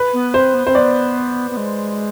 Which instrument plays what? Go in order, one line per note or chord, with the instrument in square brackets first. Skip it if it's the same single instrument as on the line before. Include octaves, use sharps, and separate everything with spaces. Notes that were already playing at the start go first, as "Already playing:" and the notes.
Already playing: [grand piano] B4
[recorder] B3
[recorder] C4 [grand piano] C5
[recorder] B3
[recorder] C4 [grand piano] C5
[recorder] B3 [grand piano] D5
[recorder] B3
G#3